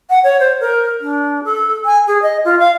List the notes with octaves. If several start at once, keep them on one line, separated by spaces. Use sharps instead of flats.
F#5
C#5
C5
A#4
D4
A4
G#5
G#4
D#5
F4
F5